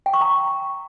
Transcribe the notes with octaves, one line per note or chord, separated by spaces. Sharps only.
G5
C#6
A#5